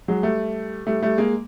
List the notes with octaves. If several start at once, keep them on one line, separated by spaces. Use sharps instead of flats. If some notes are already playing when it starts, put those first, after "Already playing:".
F#3 G#3
G3 A3
G3 A3
G3 A3
G#3 A#3